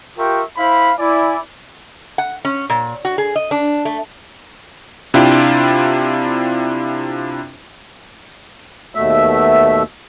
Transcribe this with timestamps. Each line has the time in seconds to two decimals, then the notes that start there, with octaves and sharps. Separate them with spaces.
0.18 F4 G4 A#4 E5 G5 C#6
0.57 E4 C5 F5 B5
0.99 E4 D5 G#5
2.18 F#5
2.45 C#4
2.70 A#2
3.05 F#4
3.18 G#4
3.36 D#5
3.51 D4
3.85 A3
5.14 C3 D4 E4 F4 G5
8.95 D#2 B2 A3 E5